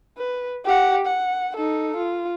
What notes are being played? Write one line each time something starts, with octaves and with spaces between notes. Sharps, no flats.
B4
G4 F#5
F#5
D#4 A4
F4